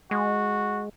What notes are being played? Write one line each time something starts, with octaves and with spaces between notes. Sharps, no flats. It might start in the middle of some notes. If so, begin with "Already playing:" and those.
G#3 F#4